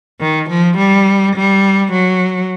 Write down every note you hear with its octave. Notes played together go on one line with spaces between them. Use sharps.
D#3
F3
G3
G3
F#3